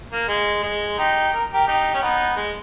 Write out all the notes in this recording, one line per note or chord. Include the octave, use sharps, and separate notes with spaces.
A#3
G#3
G#3
D#4 G4
A#4
G4 A#4
D#4 G4
C#4
B3 D#4
G#3